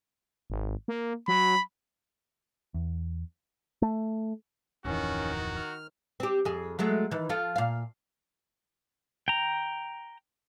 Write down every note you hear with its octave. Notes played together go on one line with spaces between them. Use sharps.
G#1
A#3
F#3 B5
E2
A3
D1 F2 D#3 E3 C#4 F#4
F6
C4 G4
F2 G#4
F#3 G#3 A3
D#3 E3
F3 F4 A4
A#2 F5
G5 A#5